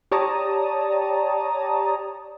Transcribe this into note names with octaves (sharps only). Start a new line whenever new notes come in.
G4 C#5 D5 A5 A#5 D#6